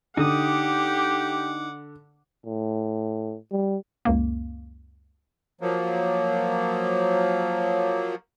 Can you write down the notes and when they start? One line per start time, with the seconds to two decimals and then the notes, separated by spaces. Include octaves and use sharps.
0.17 D3 D#4 G4 F#5 D6 D#6
2.46 A2
3.51 G3
4.05 C#2 F#2 A#3
5.61 F3 F#3 A#3